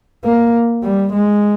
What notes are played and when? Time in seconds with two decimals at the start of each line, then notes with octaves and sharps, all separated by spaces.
0.25 A#3
0.83 G3
1.12 G#3